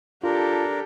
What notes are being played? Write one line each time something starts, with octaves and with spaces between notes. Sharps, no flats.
D4 F4 G4 A4 A#4